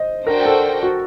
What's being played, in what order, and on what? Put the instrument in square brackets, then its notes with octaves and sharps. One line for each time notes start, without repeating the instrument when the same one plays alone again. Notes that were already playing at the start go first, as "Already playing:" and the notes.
Already playing: [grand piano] C5 D#5
[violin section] D4 F#4 C5 G5 [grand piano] A#4
[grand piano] A4
F#4